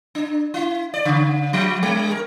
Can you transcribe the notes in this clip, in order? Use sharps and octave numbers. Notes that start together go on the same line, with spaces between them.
D4
E4
D5
C#3
F3
G3
A#4